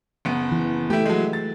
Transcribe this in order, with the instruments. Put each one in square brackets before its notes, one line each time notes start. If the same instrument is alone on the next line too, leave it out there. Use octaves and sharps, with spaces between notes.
[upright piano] F#1 B3
[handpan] E3
[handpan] A3 [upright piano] E4 G4
[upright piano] F#3 G#3
A6